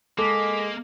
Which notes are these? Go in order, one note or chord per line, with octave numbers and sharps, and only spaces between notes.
G#3 A#3 A4 D6 B6